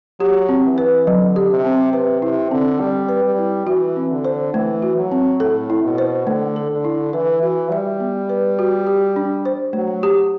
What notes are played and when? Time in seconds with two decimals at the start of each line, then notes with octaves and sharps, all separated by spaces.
0.20 F#3 G4
0.49 C4
0.64 E3
0.78 B4
1.07 D3 F#3
1.36 G4
1.50 C3
1.65 C4
1.93 C3 B4
2.22 C3 E4
2.51 D3 C4
2.80 G3 C4
3.09 B4
3.24 G3
3.38 E4
3.67 E3 F#4
3.96 C4
4.11 D3
4.25 C5
4.53 E3 A3
4.82 F#4
4.96 F#3
5.12 C4
5.40 A2 A4
5.70 E4
5.83 B2
5.98 C5
6.27 D3 A3
6.56 A4
6.70 D3
6.85 E4
7.13 E3 B4
7.42 E3 F#4
7.71 G3 E5
8.00 B3
8.29 B4
8.59 F#4
8.87 G4
9.16 D4
9.45 C5
9.73 F#3 A3
10.03 G4